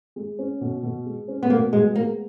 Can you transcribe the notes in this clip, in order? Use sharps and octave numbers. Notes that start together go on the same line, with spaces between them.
G#3
C#4
B2
B2
G#3
C#4
B3
B2 A#3
B2 G#3
G#3 A#3